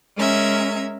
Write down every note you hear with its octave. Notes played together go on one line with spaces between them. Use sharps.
G#3 C#4 A#4 E5 G#6